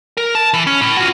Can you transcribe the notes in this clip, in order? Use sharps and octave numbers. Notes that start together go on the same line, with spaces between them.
A#4
A5
E3
C#4
A2
F4 F#4